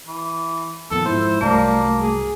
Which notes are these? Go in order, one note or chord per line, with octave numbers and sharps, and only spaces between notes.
E3
F2 A#2 D#3 B3 A4
G#2 F3 E4 C5
C2 G2 F#3 G3 A3 A#3
G#4